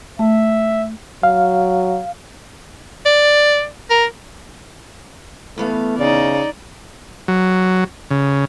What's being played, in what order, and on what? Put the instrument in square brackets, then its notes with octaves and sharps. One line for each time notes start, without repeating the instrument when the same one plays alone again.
[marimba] A3 [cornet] E5
[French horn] F#3 [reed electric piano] F5
[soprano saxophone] D5
A#4
[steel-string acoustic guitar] E2 B3 F5 [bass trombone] A3
[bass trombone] C#3 [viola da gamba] D#4 D5
[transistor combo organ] F#3
C#3